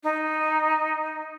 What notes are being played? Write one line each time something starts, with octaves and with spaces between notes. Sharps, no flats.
D#4